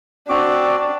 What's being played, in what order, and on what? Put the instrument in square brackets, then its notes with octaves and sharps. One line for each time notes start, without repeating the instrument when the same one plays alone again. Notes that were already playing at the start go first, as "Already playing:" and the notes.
[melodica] C4 F#4 D6 [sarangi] D4